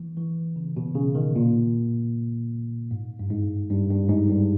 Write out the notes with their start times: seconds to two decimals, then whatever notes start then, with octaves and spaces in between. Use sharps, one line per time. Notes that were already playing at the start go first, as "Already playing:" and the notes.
Already playing: E3
0.17 E3
0.56 C#3
0.77 B2
0.95 C#3
1.15 D#3
1.36 A#2
2.91 G#2
3.19 G2
3.30 G#2
3.70 G2
3.90 G2
4.09 G#2
4.29 G2